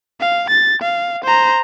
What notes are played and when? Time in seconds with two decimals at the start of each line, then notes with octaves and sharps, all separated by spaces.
0.20 F5
0.50 A6
0.82 F5
1.24 C5 A#5